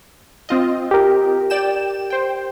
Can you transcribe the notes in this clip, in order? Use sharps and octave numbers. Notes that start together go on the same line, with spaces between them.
C4 F4 D#5
G4 A#4
D5 G5 E7
C5 G5